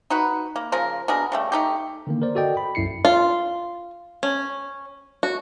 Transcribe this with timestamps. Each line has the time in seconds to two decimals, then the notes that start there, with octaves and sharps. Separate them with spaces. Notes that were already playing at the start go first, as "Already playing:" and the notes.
0.10 D#4 F#4 B4
0.56 A#3
0.72 C#3 F3 A#4
1.08 B2 D4 G#4 A#4
1.32 C#3 G3 A3
1.52 A3 D#4 G4
2.07 D3 D#3 A#3
2.22 A#4 C5 D5
2.35 F#4 A4 D5 D#5 G5
2.57 B5
2.75 C2 F#2 E4 C7 C#7
3.05 F4
4.23 C#4
5.23 F#4